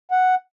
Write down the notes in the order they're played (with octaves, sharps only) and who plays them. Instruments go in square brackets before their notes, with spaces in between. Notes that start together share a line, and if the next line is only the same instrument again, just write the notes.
[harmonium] F#5